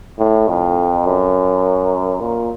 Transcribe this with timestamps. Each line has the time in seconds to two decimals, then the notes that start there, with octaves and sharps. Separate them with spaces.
0.19 A2
0.48 F2
1.06 F#2
2.21 A#2